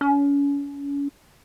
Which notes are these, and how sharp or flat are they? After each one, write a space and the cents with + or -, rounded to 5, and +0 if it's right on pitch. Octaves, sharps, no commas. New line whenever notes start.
C#4 +35